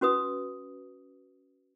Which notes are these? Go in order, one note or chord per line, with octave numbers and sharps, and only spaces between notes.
C#4 F#4 B4 D#6